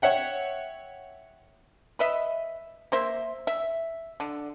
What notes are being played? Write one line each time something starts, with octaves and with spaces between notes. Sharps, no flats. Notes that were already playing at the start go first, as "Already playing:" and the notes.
C#5 E5 F#5 G5
B4 D#5 E5
A#3 C5 E5
E5
D3